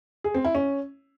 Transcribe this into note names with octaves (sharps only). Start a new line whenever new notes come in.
G#4
C4
E4
C#4